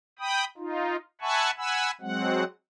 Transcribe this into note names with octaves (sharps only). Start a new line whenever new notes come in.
G5 B5 D#6
D#4 F4
E5 F#5 G#5 A5 B5 C#6
F#5 G#5 B5 E6
F#3 G#3 C4 F#5